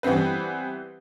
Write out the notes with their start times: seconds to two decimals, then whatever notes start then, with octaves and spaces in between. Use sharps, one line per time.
0.03 E3 G3 B3 C4 B4